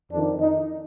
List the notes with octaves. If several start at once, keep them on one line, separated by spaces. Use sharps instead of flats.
F2 D#3 D4
D#4